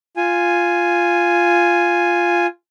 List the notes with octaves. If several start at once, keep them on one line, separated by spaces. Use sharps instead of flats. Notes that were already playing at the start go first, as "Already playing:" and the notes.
F4 G#5